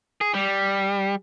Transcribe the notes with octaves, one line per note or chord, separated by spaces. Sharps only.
G#4
G3